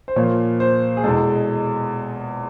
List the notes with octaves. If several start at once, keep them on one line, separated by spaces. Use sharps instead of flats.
C5
A#2 F3 A#3 C#5
C5
G#4
E2 B2 G#3 A4